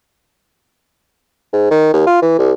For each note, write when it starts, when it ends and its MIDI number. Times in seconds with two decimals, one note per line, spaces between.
1.53 1.66 44
1.71 1.89 51
1.93 2.03 39
2.07 2.21 65
2.22 2.39 52
2.39 2.52 36